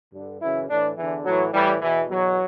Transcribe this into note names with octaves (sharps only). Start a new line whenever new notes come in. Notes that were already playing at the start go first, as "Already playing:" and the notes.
G2 D3
F#2 C#3 E3 E4
A2 E3 D4
E2 D3 E3
A2 E3 F#3
A2 E3 G3
E2 B2 E3
E2 B2 F#3